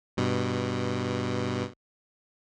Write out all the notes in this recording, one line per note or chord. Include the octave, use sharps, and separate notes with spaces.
G2 B2